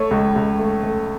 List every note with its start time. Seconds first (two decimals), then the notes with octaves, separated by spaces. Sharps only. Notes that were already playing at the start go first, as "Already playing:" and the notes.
Already playing: A3 C#5
0.11 C#2
0.36 C#2
0.59 A3
0.83 A3